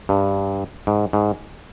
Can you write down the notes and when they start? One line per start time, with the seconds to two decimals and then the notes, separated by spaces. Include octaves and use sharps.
0.09 G2
0.87 G#2
1.13 G#2